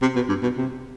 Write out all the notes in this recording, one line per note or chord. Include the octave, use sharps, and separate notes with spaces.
C3
B2
G2
B2
C3